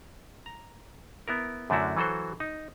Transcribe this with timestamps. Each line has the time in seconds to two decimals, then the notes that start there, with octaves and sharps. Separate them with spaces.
0.46 A#5
1.28 B3 E4 A#4
1.70 F#2 D3 A3 D4 E4 F#4
1.96 E3 F#3 F#4 A4 C5
2.40 D#4